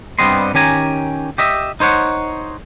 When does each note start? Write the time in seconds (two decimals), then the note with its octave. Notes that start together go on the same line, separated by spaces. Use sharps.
0.19 G2 G3 B3 C4 D#5 C6
0.54 D#3 C#4 G4 G#5 A#5
1.38 G4 D#5 E5
1.80 D#4 C5 C#5 F#5